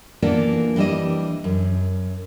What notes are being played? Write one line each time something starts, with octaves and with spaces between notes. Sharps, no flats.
E3 A#3 B3 D4 F4 A4
E3 G3 D4 E4 D#5
F#2